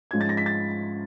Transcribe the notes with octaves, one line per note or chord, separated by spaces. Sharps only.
G#2 F3 G#3 C#4 G#6
A6
A#6
B6
A6